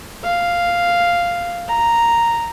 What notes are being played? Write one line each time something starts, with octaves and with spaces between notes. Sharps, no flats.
F5
A#5